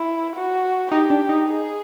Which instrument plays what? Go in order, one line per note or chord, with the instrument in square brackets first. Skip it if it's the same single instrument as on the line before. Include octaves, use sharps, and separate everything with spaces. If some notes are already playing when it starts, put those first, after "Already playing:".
Already playing: [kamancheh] E4
F#4
[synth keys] D#4 [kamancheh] G4
[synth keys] D4
D#4
[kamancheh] G#4